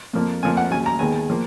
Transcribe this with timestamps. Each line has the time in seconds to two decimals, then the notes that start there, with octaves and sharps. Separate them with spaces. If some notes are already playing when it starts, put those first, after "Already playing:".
0.13 F2 F3 A#3
0.43 F2 F3 A#3 G#5
0.57 F#5
0.70 D#2 C#3 F#3 G#5
0.86 A#5
0.99 D#2 D#3 G#3 B3 G#5
1.30 F3 A#3